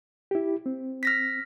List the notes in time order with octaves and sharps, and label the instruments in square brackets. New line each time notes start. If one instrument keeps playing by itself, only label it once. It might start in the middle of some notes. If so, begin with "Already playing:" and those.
[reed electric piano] E4 G4
C4
[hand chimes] F6 A#6 B6